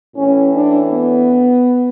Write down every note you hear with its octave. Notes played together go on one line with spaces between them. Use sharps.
A2 E3 C#4
D4
B3